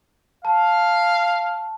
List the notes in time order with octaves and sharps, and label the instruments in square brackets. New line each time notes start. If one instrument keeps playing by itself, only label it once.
[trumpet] F5 [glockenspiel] A5